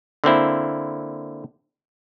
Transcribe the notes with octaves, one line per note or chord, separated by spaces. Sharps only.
D3 A#3 C4 E4